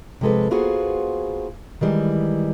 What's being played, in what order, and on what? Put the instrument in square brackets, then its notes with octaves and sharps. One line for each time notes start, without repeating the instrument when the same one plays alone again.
[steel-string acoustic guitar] C3 F3 G#3 A4 B4
A#3 B3 F4 F#4 G#4 C5
D#3 E3 G3 G#3